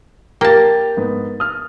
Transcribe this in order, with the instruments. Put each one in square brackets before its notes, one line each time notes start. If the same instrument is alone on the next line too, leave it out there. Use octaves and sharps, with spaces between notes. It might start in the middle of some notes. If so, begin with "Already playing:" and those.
[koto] A#3 A5 [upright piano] G4 A6
[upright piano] G#2 B3
D#6 F6